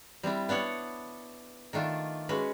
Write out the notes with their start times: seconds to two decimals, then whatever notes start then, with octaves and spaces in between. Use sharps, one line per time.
0.23 G3 C4 D4 E4
0.49 B3 D4 C#5 F#5
1.73 D#3 A3 D4 F4
2.29 G#3 C#4 F#4 B4